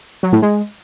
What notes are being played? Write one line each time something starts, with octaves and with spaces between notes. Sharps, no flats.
F#3
A2
G#3